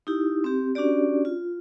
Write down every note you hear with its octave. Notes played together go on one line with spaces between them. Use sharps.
D#4 E4 G4
C4 G4
C#4 D4 F#4 G4 D5
F4